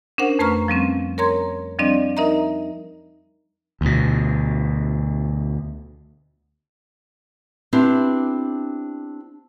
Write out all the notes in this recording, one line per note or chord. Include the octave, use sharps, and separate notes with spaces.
C#4 D4 A#4 C5 F#5
F2 A3 B4 A#5 C#6 F6
F3 G3 C4 C#4
A#4 C#5 A#5 C6 G#6
F3 G3 C4 D4 D5 D#5
D#4 A#4 D#5 E5 A#5
D2 B2
B3 C4 D4 E4 G4